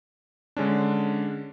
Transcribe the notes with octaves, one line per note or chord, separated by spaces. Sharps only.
D3 G#3 C#4 D4